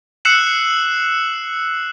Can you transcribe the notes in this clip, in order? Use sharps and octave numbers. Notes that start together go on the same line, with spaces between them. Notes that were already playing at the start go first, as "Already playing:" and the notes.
E6 F#6 C7 C#7 E7 F#7